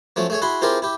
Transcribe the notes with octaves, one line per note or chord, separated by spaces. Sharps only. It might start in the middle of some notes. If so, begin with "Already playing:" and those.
F3 F#3 A3 C#4
A3 G#4 C#5
E4 F#4 G#4 B5 C6
C4 E4 F4 G4 G#4 A#4
E4 G4